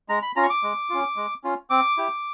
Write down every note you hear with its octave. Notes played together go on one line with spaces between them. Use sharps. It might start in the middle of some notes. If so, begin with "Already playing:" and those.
G#3 A#5
B5
C#4 F4 A#5
C#6
D6
G#3
C#4 F4
G#3
C#4 F4
C4 D6
E4 G4